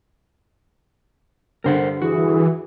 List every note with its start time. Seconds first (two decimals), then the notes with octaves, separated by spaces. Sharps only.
1.64 G2 D3 A#4 C5 F#5
2.02 E3 F#4 G#4